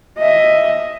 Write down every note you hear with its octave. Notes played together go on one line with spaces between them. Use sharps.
D#5 E5